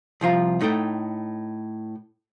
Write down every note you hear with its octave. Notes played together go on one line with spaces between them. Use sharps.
C2 F3 F4 A#5
A2 D#4 A4 F#5 G5